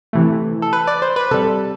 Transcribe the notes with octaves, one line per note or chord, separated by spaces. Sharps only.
C3 E3 A3
A4
B4
D5
C5
B4
C3 G3 A4